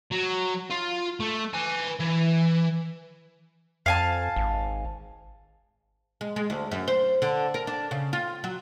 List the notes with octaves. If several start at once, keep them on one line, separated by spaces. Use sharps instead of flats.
F#3
F4
A3
B4 G#5
E3
F2 F5 G#5 A5
G#1
G#3
G#3
D2
F#2
C5
D3
A#4
D4
C#3
F4
F#3